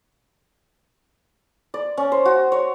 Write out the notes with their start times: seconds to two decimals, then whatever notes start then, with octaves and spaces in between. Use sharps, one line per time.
1.74 D5
1.97 C#4
2.12 C5
2.25 F#4
2.52 C#5